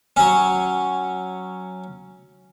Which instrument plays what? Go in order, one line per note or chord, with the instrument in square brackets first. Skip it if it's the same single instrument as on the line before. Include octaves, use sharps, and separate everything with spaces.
[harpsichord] F#3 C#4